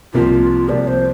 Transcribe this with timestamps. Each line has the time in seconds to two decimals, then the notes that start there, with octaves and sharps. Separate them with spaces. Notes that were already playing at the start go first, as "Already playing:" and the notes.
0.14 C2 C3 F3 A#3 F4 G4
0.69 C2 C3 F3 A#3 G4 D5
0.87 C5